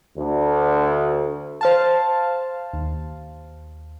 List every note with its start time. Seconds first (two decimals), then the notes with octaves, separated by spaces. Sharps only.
0.17 D2
1.61 C5 F5 A5
2.73 D#2